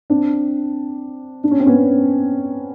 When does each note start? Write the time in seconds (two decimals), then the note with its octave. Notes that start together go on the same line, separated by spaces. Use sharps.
0.10 C4 D4
1.44 D4
1.51 C#4
1.60 C4
1.66 B3 C#4